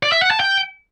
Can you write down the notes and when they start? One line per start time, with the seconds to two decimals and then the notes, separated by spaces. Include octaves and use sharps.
0.03 D5
0.12 E5
0.21 F#5
0.31 A5
0.40 G5